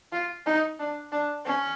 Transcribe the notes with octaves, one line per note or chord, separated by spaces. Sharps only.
F4
D#4
D4
D4
C#4